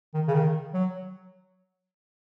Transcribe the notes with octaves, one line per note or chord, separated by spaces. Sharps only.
D#3
C#3
D#3
F#3